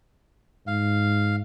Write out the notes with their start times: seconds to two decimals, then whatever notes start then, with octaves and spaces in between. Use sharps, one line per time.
0.67 G#2 F5